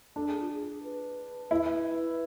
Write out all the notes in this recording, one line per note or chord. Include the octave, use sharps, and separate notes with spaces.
D4 A4
G#4
F4
G#4
B4
E4